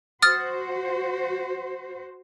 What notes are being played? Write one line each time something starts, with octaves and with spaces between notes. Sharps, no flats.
F#4 C5 D#6 F6 A6